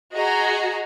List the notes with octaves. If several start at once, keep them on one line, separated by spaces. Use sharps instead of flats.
F#4 G#4 D#5 A#5